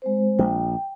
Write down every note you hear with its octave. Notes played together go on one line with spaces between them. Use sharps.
G#3 C4 C5
A#1 G5